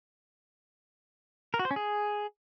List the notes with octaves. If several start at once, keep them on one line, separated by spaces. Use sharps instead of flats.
A#4
F#4
C5
C#4
G#4